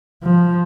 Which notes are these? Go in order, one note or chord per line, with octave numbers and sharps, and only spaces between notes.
F3